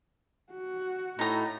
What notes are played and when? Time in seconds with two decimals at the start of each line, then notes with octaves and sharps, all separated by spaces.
0.53 F#4
1.19 A2 D#4 A#5